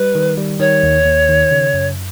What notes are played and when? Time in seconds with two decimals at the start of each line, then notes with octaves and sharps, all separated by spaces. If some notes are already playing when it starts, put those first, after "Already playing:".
Already playing: G3 B4
0.15 D#3
0.37 G3
0.60 D#3 C#5
0.83 D#2
1.05 D#2
1.29 D#3
1.51 C#3
1.74 F#2